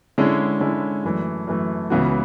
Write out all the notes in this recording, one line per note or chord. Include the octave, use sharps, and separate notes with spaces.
D3 G#3 C#4 E4
D3 G#3 C#4 E4
F#2 E3 A3
F#2 E3 A3
C#2 C#3 E3 B3 F#4